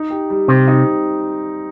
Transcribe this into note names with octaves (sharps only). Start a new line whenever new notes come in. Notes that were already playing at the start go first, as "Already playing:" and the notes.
Already playing: D#4
G4
G3
C3 C4
D#4